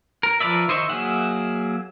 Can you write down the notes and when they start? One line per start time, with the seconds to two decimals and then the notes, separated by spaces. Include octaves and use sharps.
0.23 A#4
0.40 F3 A#4 B4 D5 E5
0.68 D#3 C5 D#5 E5 C#6
0.90 F#3 A#3 G#4 E5 F#5